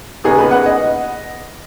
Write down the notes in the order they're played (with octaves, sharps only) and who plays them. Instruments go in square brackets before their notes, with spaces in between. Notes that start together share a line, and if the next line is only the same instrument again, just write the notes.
[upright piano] D#2 C#3 B3 D#4 G#4
B4
F#5
D#5